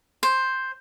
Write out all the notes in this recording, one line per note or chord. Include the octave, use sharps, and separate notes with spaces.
C5